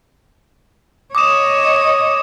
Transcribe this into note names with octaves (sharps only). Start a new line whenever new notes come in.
C#5 D#5 D6 D#6 E7